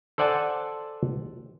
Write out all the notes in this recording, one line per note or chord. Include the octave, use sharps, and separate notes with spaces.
A4 C5 D5 F#5 G#5 A5